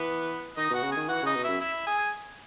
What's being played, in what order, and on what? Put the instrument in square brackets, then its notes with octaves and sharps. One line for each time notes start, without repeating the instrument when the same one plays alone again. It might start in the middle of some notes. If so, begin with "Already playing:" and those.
Already playing: [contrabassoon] E3 [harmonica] B3 B4
[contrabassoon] D#3 [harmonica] D#4 D#5
[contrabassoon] B2 [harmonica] F#4 F#5
[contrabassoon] C#3
[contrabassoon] D#3 [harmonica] G#4 G#5
[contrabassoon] E3 [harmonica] F#4 F#5
[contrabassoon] C#3 [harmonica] D#4 D#5
[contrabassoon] B2
[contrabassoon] F#2 [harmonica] E4 E5
[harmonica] E4 E5
G#4 G#5